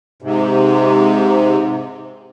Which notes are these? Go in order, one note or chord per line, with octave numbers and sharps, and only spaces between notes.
G#2 C3